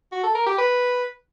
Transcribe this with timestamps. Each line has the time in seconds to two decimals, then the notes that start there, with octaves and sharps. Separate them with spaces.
0.12 F#4
0.23 A4
0.35 A#4
0.46 G4
0.58 B4